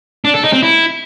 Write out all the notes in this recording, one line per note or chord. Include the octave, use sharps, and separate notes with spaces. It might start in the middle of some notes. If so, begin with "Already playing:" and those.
D4
A4
D#4
C4
E4